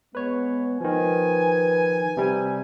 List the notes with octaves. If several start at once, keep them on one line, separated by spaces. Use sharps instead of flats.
G#3 B3 B4 C#5
D#3 F3 B4 G#5
C3 G3